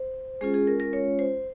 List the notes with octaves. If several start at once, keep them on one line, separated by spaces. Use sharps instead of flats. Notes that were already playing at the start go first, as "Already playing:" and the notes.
Already playing: C5
G#3 C#4 F4 G#4
G#4
A#4
A#4
C#5
C5